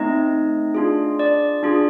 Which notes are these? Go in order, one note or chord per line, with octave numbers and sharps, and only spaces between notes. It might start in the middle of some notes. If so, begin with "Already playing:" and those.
Already playing: A3 C4 D#4 D#5
D4 F4 G#4
D5
D4 F4 G#4